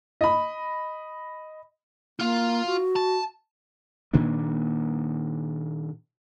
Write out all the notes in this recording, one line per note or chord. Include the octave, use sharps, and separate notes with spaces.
D#5 B5
A#3 F4 F5
F#4
A5
A#2 D#3 A#3 D4